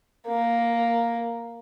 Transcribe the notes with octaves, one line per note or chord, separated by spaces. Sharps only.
A#3